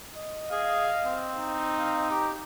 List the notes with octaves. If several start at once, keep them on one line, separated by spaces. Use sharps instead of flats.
D#5
G#4 F5
C4
D#4
D#5 F5
G4 A#5